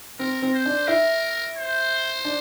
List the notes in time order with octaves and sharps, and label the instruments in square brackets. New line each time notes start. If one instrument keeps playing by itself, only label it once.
[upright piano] C4 [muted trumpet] A#4
[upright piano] C4
[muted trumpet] C5
[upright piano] D4
[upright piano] E4 [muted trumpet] A#4
[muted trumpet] C5
[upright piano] D4